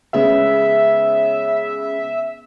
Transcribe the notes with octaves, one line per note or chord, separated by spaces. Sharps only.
C#3 G#3 B3 E5